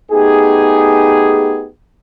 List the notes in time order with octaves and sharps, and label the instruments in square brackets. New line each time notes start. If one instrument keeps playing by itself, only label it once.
[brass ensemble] A3 B3 D#4 G4 G#4